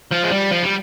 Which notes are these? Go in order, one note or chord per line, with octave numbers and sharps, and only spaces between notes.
F3
G#3
G3
F3
G3